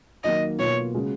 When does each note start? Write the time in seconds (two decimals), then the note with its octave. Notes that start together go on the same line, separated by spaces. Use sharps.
0.24 D#3 F#3 A#3 D#5
0.58 B2 A#3 F4 C#5
0.93 C#3 G#3 C#4 F#4